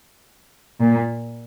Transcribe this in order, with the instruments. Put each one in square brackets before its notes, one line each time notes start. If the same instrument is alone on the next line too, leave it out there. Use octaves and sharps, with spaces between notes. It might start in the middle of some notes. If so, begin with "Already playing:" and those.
[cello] A#2